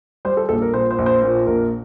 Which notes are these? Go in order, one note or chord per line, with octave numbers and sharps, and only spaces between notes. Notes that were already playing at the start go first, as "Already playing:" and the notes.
G3 C5
A4
A#1 A4
A#4
A#2 C5
C5
A#1
C5
A#2 C5
A#1 A#4